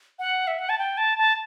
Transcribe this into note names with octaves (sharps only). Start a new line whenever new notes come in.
F#5
E5
F#5
A5
G5
A5
A5